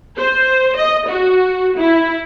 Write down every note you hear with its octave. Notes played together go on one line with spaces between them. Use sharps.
C5
D#5
F#4
E4